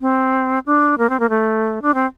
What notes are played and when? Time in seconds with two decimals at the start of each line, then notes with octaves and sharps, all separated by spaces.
0.01 C4
0.66 D4
0.98 A#3
1.09 C4
1.20 A#3
1.29 A3
1.82 D4
1.94 C4